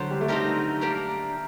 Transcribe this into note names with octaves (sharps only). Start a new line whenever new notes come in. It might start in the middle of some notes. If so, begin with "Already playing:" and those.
Already playing: D3 F#3 G4 C5 F#5 A5
G3
A3
G3 C4 D#4 G4 A#4
A3 A#3 D4 G4 A#4